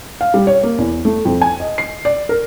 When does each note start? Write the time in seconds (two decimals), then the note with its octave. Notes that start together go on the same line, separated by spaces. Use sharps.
0.21 F5
0.34 G3
0.47 C#5
0.63 A#3
0.78 E2
1.05 A3
1.25 F2
1.41 G#5
1.60 D#5
1.78 C7
2.05 D5
2.29 A#4